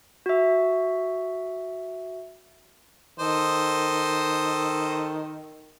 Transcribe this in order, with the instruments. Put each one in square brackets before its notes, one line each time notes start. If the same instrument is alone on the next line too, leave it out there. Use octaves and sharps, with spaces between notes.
[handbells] F#4 E5
[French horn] D#3 [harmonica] A4 C5 D#5